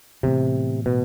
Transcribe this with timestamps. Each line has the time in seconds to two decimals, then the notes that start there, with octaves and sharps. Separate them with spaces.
0.23 A2 C3 E3 B3
0.86 B2